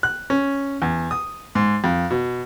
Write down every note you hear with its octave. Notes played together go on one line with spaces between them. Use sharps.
F#6
C#4
E2
D#6
G#2
F2
B2